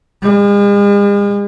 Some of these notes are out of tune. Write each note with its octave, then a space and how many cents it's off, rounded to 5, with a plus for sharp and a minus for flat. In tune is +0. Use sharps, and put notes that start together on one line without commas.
G#3 -45